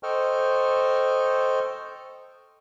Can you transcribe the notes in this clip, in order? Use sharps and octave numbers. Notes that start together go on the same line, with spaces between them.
A4 C5 D#5 G5 C#6 F6